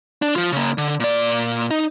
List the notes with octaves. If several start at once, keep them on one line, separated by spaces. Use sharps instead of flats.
D4
F3 F4
C#3 A#3
D3
A#2 D5
D#4